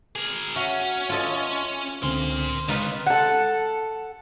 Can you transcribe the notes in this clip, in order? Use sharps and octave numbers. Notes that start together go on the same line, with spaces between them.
G#4 A#4
C#4 F#4 E5
F4 A4 D#5
C#2 D3 C4 A#4 C6
C#2 G#3 D#4 F4 B4
A4 F#5